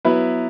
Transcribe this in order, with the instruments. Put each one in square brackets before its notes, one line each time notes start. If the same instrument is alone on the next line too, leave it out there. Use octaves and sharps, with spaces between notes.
[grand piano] F#3 B3 E4 B4